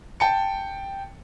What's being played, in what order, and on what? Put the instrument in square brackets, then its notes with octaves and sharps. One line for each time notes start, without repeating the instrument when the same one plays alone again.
[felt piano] G5 A5 C#7